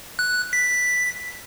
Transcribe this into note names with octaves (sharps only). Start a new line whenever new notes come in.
F#6
B6